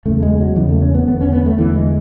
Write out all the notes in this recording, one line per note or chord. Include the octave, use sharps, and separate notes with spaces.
E2 C#3 A3
G#3
F#3
E2 C#3 E3
A3
C#4
B3
E2 D3 B3
C#4
B3
A3
E2 D3 E3
G#3